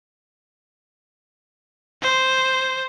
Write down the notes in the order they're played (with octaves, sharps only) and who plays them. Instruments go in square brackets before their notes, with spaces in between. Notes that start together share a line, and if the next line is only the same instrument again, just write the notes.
[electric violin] C5